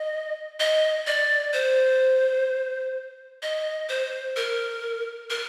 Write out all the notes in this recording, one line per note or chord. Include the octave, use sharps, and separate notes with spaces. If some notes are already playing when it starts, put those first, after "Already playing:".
Already playing: D#5
D#5
D5
C5
D#5
C5
A#4
A#4